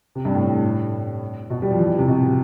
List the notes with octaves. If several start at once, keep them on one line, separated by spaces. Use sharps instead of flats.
C3
G2
A2
B2
G3
F3
E3
C3
B2